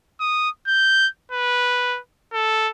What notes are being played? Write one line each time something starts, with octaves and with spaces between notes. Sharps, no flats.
D#6
G6
B4
A4